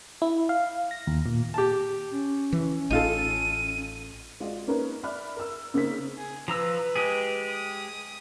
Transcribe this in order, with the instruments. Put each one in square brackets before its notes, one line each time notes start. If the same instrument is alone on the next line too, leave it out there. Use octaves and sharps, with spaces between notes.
[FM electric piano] E4
F5
A#6
D#2
A#2
[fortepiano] G4 A5
[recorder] C#4
[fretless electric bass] E3
[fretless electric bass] A1 [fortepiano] D#4 F4 A4 [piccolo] D#7
[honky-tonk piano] G#3 F4 F#4 D5 D#5
A#3 C#4 D#4 A#4 B4
D5 E5 B5 F6 F#6
A#4 E6
C#3 A#3 C4 D#4 B6
[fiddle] G#4
[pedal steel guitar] F3 A#5 E6 [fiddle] B4
[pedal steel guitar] G#3 G4 G#4
[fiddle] D#6